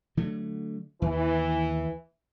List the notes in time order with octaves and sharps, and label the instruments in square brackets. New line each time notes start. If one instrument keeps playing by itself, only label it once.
[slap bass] D3 F#3 A3
[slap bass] D#2 [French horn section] E3